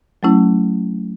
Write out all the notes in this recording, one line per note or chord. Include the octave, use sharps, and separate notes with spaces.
F#3 A3 C#4 E4